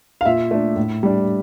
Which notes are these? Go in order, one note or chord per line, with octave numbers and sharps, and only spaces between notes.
F5
A#2 E5
A3 D4
A2
G3 D4